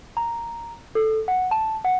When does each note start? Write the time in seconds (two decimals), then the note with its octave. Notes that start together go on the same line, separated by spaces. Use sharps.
0.17 A#5
0.95 A4
1.28 F#5
1.51 A5
1.85 F#5